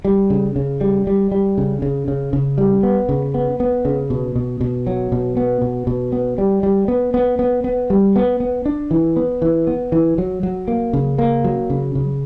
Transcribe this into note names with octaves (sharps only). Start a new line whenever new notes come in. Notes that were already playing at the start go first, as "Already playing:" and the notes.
G3
C#3
C#3
G3
G3
G3
C#3
C#3
C#3
C#3
G3
B3
C#3
B3
B3
C#3
B2
B2
B2
F#3
B2
B3
B2
B2
B3
G3
G3
B3
B3
B3
B3
G3
B3
B3
D4
E3
B3
E3
B3
E3
F#3
F#3
A#3
C#3
A#3
F#3
C#3
C#3